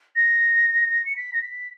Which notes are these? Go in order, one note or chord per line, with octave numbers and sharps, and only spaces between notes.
A#6
C#7
B6
A#6
B6